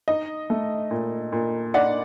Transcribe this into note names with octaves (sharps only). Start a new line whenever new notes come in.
D#4 D#5
A3
A#2
A#2
D#4 D5 F#5